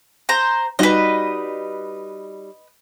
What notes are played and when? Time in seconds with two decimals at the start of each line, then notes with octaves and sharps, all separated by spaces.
0.29 C5 A#5
0.79 G3 D#4 F#4 B4 D#5